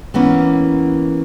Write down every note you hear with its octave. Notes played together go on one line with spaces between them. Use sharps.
E3 A#3 B3 C#4